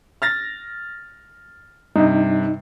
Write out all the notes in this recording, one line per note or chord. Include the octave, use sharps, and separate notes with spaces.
F6 A6 A#6
G2 C3 D#4